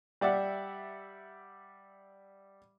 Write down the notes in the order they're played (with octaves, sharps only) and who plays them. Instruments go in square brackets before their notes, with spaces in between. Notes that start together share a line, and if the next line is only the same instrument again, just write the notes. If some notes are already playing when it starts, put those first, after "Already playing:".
[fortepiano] G3 D5 E5 F#5